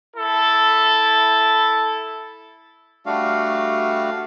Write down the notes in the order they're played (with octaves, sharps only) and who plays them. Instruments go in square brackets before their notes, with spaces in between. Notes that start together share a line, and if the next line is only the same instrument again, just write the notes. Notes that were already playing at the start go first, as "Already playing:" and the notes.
[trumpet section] E4 A4
[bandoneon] G3 A3 D4 F#4 F5